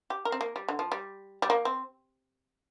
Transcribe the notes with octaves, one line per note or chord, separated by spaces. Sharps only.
G4
A#4
C4
A#3
G3
D3
F3
G3
G3
A#3
C4